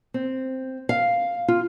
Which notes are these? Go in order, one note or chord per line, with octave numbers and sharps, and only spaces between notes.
C4
F5
F4